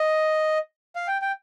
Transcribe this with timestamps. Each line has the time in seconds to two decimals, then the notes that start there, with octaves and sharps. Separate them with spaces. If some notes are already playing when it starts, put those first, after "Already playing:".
Already playing: D#5
0.96 F5
1.07 G5
1.22 G5